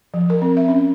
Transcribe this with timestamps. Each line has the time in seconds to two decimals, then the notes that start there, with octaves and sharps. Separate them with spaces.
0.14 F3
0.30 A#4
0.42 C4
0.57 E5
0.68 C#4